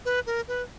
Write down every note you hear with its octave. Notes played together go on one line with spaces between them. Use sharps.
B4
A#4
B4